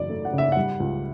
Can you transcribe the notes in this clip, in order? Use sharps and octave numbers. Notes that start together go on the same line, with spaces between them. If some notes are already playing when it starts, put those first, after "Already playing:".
Already playing: F#2 C#3 E3 D5
A3
F#5
C#3
E5
G3 F#5
C#2